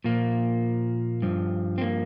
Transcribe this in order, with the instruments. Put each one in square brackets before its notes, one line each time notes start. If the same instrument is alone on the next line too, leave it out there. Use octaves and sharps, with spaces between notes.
[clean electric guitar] A#2 F3 A#3
G2 F3
C4
A#3